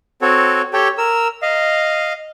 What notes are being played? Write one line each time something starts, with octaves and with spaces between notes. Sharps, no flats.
C4 F#4 A4 C#5
G4 A4 C#5 G5
A#4 E6
D#5 F5